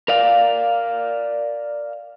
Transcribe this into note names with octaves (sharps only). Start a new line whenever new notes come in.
A#4 D5 F5